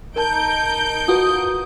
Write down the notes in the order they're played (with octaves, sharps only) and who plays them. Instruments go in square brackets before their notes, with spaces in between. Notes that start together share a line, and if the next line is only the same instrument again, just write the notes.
[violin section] D#4 G6 D7 [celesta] A#4 A5
[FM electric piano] F4 F#4 B4 [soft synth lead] D#6